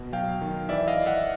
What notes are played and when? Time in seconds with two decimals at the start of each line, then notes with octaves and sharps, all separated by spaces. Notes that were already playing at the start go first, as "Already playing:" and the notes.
Already playing: B2
0.12 F#3 F5 G5
0.41 D#3
0.69 E3 D5 E5
0.88 D#5 F5
0.97 E3
1.06 E5 F#5